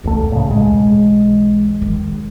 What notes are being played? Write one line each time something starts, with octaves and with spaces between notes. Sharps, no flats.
E1 C#2 A3
A2 C#3
B1 E2 G#3
D#3 G#3